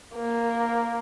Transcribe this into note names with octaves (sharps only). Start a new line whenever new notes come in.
A#3